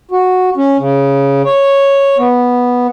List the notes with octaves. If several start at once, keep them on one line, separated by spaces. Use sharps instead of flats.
F#4
C#4
C#3
C#5
B3